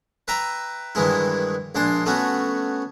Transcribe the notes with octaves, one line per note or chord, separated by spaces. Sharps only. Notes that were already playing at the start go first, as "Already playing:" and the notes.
B4 E5 G5 A#5
G2 D#3 E3 G#3 E4
A#1 G#3 D4 C6
A3 B3 C#4 F#4